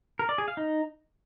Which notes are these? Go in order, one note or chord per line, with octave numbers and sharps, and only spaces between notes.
A#4
D5
G#4
F5
D#4